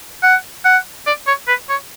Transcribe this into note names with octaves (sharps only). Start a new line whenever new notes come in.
F#5
F#5
D5
C#5
B4
C#5